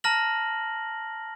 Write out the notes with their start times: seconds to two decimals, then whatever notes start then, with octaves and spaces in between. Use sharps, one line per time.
0.04 A5 A#5 F6 A#6 F#7